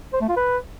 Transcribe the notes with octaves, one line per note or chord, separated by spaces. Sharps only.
C5
A3
F4
B4